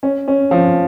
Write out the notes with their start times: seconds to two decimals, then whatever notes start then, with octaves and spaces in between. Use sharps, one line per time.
0.03 C#4
0.28 C#4
0.51 F3